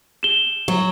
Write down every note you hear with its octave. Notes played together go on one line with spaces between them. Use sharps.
E7 G7
F#3